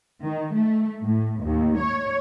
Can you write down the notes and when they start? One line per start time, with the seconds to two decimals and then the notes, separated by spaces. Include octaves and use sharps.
0.24 D#3
0.54 A3
1.03 A2
1.42 D#2
1.78 C#5